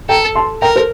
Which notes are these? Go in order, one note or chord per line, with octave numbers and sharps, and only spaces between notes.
A4 G5 A#5
A5 C6
A#4 G5 A#5
A4 C5